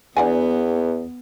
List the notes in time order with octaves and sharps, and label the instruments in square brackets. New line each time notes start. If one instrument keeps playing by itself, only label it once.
[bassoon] E2 [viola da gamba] B3 [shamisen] D4 F#5 G#5